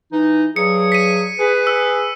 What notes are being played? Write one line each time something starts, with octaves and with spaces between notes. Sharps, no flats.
E3 D#4
G2 F#3 G#4 C#7
B6 D#7
G#4 B4
E6